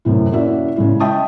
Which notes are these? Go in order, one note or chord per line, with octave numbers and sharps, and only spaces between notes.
F#2 A2 C3 E3
A#3 C#4 E4 F#4 D5 E5
C#3 G#3 E4
D#5 E5 G5 A5 D#6